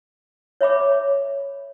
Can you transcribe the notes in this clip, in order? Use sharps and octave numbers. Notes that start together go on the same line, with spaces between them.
C#5 E5 B5 D6